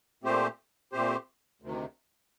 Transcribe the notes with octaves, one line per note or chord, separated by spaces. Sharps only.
A#2 A3 C4 G4 C5
A#2 A3 C4 G4 C5
D2 C3 D#3